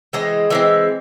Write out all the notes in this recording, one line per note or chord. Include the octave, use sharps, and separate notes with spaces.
E3 G#3 C4 D#5
E3 G#3 C4 E5